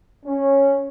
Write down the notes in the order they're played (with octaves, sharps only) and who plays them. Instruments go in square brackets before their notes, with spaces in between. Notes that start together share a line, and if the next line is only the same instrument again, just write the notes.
[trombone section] C#4